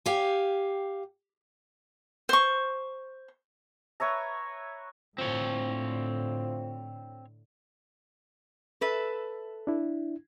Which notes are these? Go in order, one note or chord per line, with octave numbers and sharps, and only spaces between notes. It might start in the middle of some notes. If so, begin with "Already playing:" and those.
G4 F5 G5 G#5
C5 C#6
B4 C#5 E5 A#5
A2 D3 F3 C4 C#5
A4 B4 E5
D4 E4